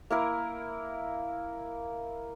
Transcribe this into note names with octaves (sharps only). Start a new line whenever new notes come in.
A#3 E4 A#4